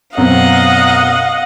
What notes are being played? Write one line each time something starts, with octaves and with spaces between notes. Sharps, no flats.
F#2 B2 C4 D#5 F5 F#5